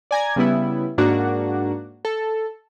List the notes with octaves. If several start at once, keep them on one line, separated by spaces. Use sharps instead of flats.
D5 G#5 A#5 G#6
C#3 G3 B3 E4
G#2 A#3 D4 F#4
A4